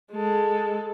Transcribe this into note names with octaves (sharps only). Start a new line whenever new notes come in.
G#3 A4